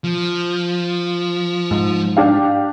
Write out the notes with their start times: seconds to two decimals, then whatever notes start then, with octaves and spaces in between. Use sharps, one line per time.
0.04 F3
1.71 G#2
2.17 D4 G4 F5